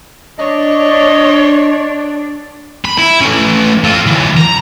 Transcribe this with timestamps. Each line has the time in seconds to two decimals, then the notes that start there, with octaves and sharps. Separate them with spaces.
0.39 D4 C#5 D#5
2.85 B5
2.98 E4
3.21 A3 C#4
3.84 F4 A4
4.07 E3 F#3
4.37 A#5